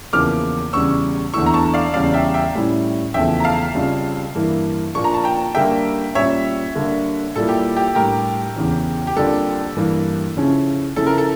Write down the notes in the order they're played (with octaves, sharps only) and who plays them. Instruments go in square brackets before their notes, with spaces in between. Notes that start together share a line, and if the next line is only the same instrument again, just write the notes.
[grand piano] E2 C#3 F3 A#3 E4 [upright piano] D6 F6
[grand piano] E2 C#3 G3 C#4 [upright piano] C#6 E6
[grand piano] E2 D3 A3 E4 [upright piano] C#6 E6
[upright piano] A#5
A5 C#6
D5 F5
[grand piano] E2 C#3 G3 C#4 [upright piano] D5 F5
[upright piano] E5 G5
E5 G5
[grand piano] A2 G3 C#4 E4
[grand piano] E2 C#3 F3 A3 [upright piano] E5 G5
[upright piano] A#5
F5 A5
[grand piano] F2 C#3 G3
G2 E3 A#3 E4
[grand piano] A#2 F3 A#3 D4 [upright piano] C#6
[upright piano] A#5
A5
G5 A#5
[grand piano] D3 G3 A#3 [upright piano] E5 G5
[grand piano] A#2 G3 C#4 [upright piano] C#5 E5
[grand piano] D3 G3 A#3
[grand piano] A#2 G3 A#3 E4 [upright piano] A4
[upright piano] G4
G4
[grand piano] A2 G3 D4 [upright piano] G4 A#4
[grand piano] E2 C#3 E3
[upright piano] G4
[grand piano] F2 D3 G3 A#3 D4 [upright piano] A4
[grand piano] G2 E3 A#3
C#3 F3 C#4 E4
[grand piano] C#3 F3 C#4 E4 [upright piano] A4
[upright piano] A#4
A4